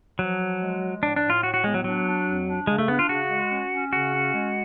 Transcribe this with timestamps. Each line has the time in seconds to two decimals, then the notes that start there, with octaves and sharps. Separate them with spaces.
0.19 F3 F#3
0.40 F3
0.61 G#3
0.81 F3
1.02 A2 D4
1.16 D4
1.22 A2
1.30 F4
1.43 A2 F#4
1.54 F#4
1.64 G#3 B3
1.74 F#3
1.84 F#3 D4
2.06 D4
2.27 F2
2.47 D4
2.67 C#3 G#3
2.78 A3
2.88 B3 D4
2.99 F4
3.09 C#3 F#4
3.30 G#3
3.51 C#4
3.72 C#4
3.92 C#3 F#4
4.12 C#4
4.34 G#3